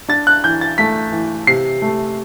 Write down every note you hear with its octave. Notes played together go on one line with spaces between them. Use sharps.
D4 A6
F#6
E3 G6
A6
A3 B6
E3
C3 C7
A3